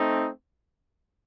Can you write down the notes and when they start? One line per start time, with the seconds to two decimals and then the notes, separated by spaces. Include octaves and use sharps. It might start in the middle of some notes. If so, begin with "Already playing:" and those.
Already playing: A3 C4 D#4